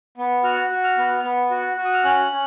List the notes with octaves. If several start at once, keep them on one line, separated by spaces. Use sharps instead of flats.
B3
F#4 F6
F#4
F6
B3
B3
F#4
F#4
D#6
F6
C#4 F#6
C#4